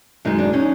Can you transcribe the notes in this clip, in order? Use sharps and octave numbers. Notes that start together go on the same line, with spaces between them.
F#2 D#3 G#3 D#4
D4
C#4 D#4